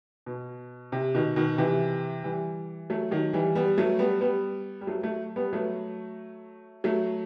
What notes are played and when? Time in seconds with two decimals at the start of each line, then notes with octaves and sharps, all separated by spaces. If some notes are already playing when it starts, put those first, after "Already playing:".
0.26 B2
0.92 C3
1.14 B2 D#3
1.36 B2 D#3
1.58 C3 E3
2.24 E3 G3
2.90 F#3 A3
3.11 D#3 F#3
3.33 E3 G3
3.55 G3 B3
3.78 F#3 A3
3.99 G3 B3
4.21 G3 B3
4.81 G3
4.87 F#3 A3
5.03 F#3 A3
5.36 G3 B3
5.53 F#3 A3
6.84 F#3 A3